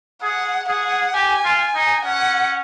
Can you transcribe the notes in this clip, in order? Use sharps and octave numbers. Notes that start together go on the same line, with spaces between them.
G#4 F#5
G#4 F#5
G4 G#5
F4
G#5
D#4
C#4 F#5